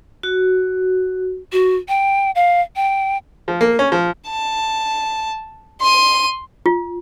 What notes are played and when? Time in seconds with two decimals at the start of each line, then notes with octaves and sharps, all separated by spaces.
0.23 F#4
1.52 F#4
1.89 G5
2.35 F5
2.76 G5
3.48 F3
3.61 A#3
3.79 C#4
3.92 F3
4.28 A5
5.81 C6 D#7
6.66 F4